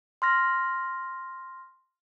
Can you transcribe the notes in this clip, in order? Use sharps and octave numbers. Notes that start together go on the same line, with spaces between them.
C6 F6 A#6